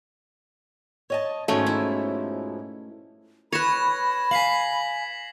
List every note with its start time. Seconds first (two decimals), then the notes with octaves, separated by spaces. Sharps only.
1.10 C#5 D#5 A5
1.48 G#2 B2 F3 A3 C#4 C#5
1.67 E4
3.52 B4 C#5 B5 G#6 A#6 E7
4.31 F5 G#5 B6 C7 F#7